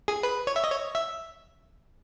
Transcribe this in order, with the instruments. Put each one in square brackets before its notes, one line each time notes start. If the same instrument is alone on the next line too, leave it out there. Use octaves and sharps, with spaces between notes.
[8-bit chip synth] G#4
B4
C#5
E5
D#5
C#5
E5